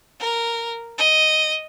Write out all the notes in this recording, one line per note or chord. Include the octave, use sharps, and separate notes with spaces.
A#4
D#5